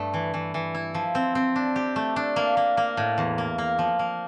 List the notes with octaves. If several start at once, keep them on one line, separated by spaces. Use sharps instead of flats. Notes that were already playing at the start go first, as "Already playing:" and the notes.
Already playing: G2 A3
E3
E3
E3
E4
F3
C4
C4
D4
G4
A3
D4
A#3
A#3
A#3
A2
E2
A#3
A#3
F3
A#3